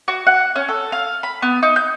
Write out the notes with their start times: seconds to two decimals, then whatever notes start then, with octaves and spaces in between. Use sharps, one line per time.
0.08 F#4
0.27 F#5
0.56 C#4
0.68 A4
0.92 F5
1.23 B5
1.42 B3
1.63 D#4
1.76 G6